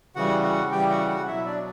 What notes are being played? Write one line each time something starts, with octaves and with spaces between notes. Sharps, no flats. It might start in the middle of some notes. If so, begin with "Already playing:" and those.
C#3 E3 G3 F#4 F#5
F#4 F#5
C#3 E3 G3 G4 G5
F#4 F#5
F#4 F#5
B2 F#3 E4 E5
D4 D5